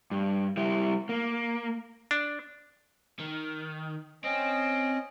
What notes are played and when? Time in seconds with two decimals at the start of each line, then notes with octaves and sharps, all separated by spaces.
0.11 G2
0.57 G3 E4
1.09 A#3
2.11 D4
3.19 D#3
4.24 C4 C#4 D#5